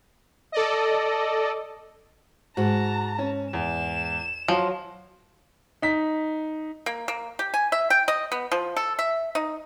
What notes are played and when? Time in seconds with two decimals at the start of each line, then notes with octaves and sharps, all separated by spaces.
0.52 A4 D5 D#5
2.57 G#2 F#4 A5 A#5
3.19 C#4
3.53 E2 E7
4.48 F3 F#3
5.82 D#4 B6
6.86 A#3
7.08 A#3
7.39 G4
7.54 G#5
7.72 E5
7.90 G5
8.08 D#5
8.32 B3
8.52 F3
8.77 A4
8.99 E5
9.35 D#4